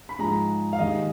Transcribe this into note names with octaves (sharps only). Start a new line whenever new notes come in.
B5
G#2 F3 G#3 A#5
F5
D#2 D#3 G#3 D#5